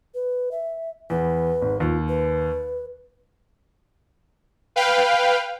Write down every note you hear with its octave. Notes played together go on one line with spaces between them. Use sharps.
B4
E5
E2 B4
G#1
D#2 F4
B4
B4 F5 G5